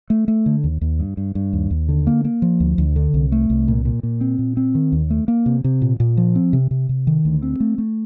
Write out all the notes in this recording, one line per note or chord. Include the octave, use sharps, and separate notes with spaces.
A3
A3
D3
D#2
D#2
G2
G2
G2
D#2
D#2
D3
A#3
A#3
F3
D2
D2
D3
C2
A3
C2
A#2
A#2
A#2
C4
A#2
C4
D#3
D#2
A3
A#3
C3
C3
A#2
A#2
F3
C4
C3
C3
C3
D#3
D2
C4
A3
A3